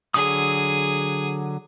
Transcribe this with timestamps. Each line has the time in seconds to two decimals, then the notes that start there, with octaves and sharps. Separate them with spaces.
0.14 D3 F#3 G#4 D#6